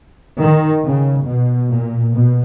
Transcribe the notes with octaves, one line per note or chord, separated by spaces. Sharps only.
D#3
C#3
B2
A#2
B2